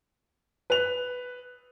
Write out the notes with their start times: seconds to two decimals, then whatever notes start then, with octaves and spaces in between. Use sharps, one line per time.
0.70 B4 F7